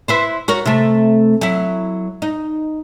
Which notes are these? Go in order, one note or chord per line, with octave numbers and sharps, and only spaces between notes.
E4 B4 C5
F#4 A#4 C#5
C3 A3
F#3 E4
D#4